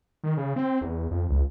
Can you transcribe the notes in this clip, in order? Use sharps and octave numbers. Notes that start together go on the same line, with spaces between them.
D#3
C#3
C4
E2
F2
C#2